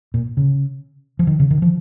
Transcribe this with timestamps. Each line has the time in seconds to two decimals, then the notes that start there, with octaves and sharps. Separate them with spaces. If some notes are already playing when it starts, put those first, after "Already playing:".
0.14 A#2
0.37 C#3
1.19 F3
1.27 D#3
1.40 C#3
1.50 D#3
1.62 F3